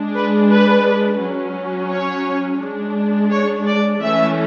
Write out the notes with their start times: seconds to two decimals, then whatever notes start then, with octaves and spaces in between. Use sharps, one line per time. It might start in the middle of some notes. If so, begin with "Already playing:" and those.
Already playing: G#3 D4
0.15 B4
0.50 B4
1.20 F#3 C#4
1.90 C#5
2.60 G#3 D4
3.31 C#5
3.66 D5
4.00 E3 A3 C#4 E5